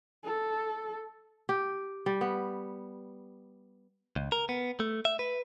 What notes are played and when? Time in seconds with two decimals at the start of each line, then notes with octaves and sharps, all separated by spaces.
0.25 A4
1.49 G4
2.06 G3
2.21 B3
4.16 C#2
4.32 A#4
4.49 B3
4.80 A3
5.05 E5
5.19 B4